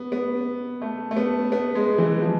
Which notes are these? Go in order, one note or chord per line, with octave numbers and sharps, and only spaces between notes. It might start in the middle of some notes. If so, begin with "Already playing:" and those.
Already playing: B3
B3
A3
A3
B3
B3
G#3
E3
F3